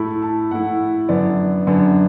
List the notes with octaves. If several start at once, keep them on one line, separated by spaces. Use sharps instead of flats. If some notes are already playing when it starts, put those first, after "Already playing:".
Already playing: A2 A3 E4 B5
A5
A2 A3 E4 F#5
F#2 D3 B3 D4 D5
F#2 D3 B3 D4